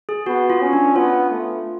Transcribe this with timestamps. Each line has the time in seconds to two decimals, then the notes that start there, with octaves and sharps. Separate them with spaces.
0.09 G#4
0.26 B3 F#4
0.50 F4
0.61 C#4
0.73 D4
0.96 B3 F4
1.31 A3